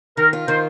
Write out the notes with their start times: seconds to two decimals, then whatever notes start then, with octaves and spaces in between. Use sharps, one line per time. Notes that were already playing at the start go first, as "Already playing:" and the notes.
0.17 D#3 A#4
0.33 F4
0.48 D#3 C5